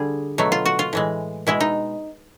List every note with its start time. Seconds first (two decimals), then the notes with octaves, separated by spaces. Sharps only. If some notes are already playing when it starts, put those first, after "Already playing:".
Already playing: D3 G3 G#4
0.38 B2 F#3 A3
0.52 F4
0.66 F#4
0.79 F4
0.93 A2 E3 G#3
1.47 B2 G#3 E4
1.60 D#4